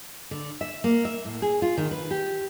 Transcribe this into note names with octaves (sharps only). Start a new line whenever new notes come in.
D3
E5
A#3
E5
A2
G#4
F4
D#3
B4
G4